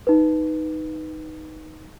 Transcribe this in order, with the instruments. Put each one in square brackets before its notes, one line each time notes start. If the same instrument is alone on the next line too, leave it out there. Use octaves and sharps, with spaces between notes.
[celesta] D#4 B4